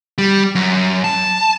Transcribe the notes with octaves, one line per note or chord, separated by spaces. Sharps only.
G3
F#2
A5